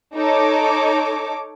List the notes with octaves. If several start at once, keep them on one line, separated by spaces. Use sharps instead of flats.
D#4 A4 C#5 D6